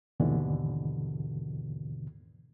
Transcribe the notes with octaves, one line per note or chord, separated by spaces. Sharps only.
D#2 G#2 B2 D3 E3